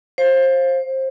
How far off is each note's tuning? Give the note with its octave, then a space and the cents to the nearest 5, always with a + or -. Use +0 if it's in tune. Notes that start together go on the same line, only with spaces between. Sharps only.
C5 +25 F5 +0